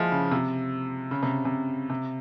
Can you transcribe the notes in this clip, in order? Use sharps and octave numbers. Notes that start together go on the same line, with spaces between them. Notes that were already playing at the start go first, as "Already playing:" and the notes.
Already playing: F3 G#3 E4
C#3
C3
C#3
C3
C3
C3